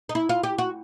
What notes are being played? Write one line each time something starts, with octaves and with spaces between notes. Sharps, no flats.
D#4
E4
F4
G4
F#4